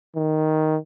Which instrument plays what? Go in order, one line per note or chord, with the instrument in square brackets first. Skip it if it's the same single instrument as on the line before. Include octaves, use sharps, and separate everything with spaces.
[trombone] D#3